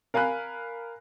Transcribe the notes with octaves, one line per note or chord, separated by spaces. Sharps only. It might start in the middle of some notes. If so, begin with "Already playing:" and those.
A#4 F5 G#5 B5 F#6